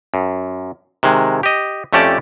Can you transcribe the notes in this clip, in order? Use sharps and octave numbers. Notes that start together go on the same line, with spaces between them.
F#2
C3 D#3 G#3
G4 D#5
F2 A3 C#4 G4 D5 A5